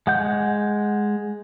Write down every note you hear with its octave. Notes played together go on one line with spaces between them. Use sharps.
G#3 F#5 G6